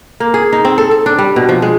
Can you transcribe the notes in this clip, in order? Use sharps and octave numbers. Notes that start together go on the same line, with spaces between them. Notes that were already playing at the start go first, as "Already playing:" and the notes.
A#3
G#4
D#4
C4
A4
A4
D4
G3
B2
F3
G#3